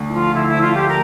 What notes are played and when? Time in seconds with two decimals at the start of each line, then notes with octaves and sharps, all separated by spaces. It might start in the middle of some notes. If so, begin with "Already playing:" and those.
Already playing: D2 D3
0.09 E4
0.14 F3 F4
0.34 D3 E4
0.47 E4
0.54 F3
0.61 F4
0.74 A3 G4
0.88 A#4